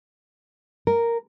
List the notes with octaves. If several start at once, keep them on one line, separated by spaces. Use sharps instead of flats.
A#4